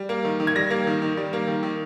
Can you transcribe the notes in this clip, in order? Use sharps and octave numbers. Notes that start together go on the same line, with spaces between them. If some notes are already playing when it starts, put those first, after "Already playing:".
Already playing: G3
A#3
D#3
D#3
G#6
G3 A#6
A#3
D#3
D#3
G3
A#3
D#3
D#3